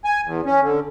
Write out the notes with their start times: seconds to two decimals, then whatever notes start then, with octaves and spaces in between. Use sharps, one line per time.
0.05 G#5
0.25 E2
0.46 C#4
0.62 D3